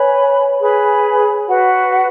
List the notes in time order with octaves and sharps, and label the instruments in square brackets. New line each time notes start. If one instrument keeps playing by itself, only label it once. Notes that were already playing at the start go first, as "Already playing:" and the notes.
Already playing: [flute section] B4 G#5 B5 [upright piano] C#5
[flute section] G#4 B4 G#5 B5
F#4 B4 F#5